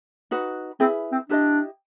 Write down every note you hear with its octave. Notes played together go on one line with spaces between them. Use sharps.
D#4 F#4 B4
C4 E4 G#4 B4
C4
D4 E4 G4 B4 D#5